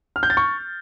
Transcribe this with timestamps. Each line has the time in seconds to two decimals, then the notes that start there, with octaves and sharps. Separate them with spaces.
0.16 F6
0.23 G6
0.30 A6
0.37 C#6